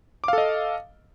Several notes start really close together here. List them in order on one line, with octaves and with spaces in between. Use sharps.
D6 F5 A4 D#5